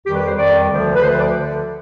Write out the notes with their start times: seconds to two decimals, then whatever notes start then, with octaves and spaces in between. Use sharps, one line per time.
0.05 F2 D#3 G3 G4
0.15 B4
0.27 C5
0.37 F2 D#3 G3 D5
0.69 D2 D3 F3
0.95 B4
1.01 D2 D3 F3 C5
1.17 D5
1.34 D3